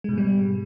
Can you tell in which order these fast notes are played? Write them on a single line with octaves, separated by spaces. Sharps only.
G#3 B2 G#2 G3